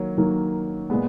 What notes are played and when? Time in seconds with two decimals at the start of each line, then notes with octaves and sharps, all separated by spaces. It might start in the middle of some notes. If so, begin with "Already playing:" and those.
Already playing: D#3 F#3 A#3 C#5
0.18 D#3 F#3 A#3
0.90 A#2 G#3 B3